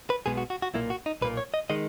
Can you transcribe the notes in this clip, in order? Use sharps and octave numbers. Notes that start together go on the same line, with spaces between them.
B4
B1 B2 G#3 B3 G#4
F#4
F#4
F#4
B1 A#2 A#3 E4
F#4
D#4
B1 A#2 A#3 B4
C#5
D#5
D#3 G#3 D#5